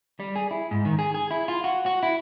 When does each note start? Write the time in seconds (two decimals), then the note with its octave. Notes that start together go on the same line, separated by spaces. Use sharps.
0.20 G3
0.36 G#4
0.51 E4
0.71 G#2
0.85 D#3
0.99 G#4
1.14 G#4
1.31 E4
1.48 F4
1.64 F#4
1.86 F#4
2.03 E4